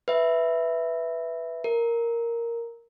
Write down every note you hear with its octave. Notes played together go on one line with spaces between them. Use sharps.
B4 E5
A#4